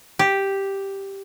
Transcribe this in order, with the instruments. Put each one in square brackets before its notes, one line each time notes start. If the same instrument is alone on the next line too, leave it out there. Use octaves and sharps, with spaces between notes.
[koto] G4